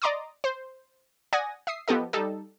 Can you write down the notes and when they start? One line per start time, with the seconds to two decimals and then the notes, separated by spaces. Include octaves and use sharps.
0.02 D5 D#5 A#5 C6 D6 D#6
0.44 C5
1.33 D5 F#5 G#5 D#6 A#6
1.67 E5 D#6 C7
1.88 F3 B3 G4 A4 D#5
2.13 G3 D#4 A4